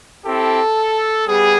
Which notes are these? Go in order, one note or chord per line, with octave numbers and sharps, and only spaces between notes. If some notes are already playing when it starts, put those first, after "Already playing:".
C4 E4 G4 A4
G3 B3 G#4